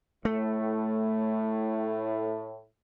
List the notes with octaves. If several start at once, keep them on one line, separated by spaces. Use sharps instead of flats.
A2 A3